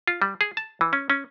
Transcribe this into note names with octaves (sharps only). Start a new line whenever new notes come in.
F4
G3
G#4
A5
E3
C#4
C#4